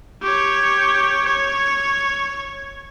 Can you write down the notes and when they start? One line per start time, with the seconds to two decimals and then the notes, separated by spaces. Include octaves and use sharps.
0.23 G4 C#5
1.26 C#5